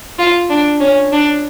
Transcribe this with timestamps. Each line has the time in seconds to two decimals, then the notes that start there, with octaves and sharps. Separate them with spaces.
0.19 F4
0.50 D4
0.80 C#4
1.13 D4